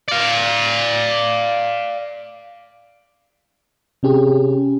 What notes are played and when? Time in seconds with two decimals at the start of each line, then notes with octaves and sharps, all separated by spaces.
0.08 D5 F5
4.03 C3 C#4 G4 G#4